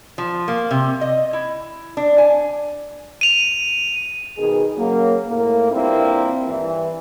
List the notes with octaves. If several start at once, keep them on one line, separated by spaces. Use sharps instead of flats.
F3
A#3
C3
D#5
E4
D4
G#5
D#7 F7
B2 D#3 G#4
C#3 F#3 A#3
A2 A#3
G2 A#2 A#3 C4 E4
G2 E3